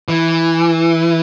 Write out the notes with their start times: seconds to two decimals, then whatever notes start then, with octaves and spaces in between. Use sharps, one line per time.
0.08 E3